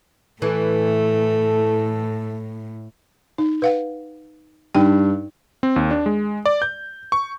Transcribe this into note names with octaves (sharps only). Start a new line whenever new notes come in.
A2 E3 A3 A4
D#4
B4 F5 F#5
G2 D#4 G5
C4
D#2
D4
G#3
D5
G6
C#6